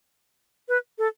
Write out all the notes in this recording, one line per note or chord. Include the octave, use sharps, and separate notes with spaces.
B4
A4